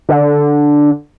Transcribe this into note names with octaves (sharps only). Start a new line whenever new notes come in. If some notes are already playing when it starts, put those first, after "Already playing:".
D3